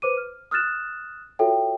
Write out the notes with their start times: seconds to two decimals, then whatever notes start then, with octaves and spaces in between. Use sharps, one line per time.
0.02 B4 C5 D6 D#7
0.17 F6
0.51 D#6 F6 F#6 A6 E7
1.39 F4 F#4 A4 C#5 E5 G5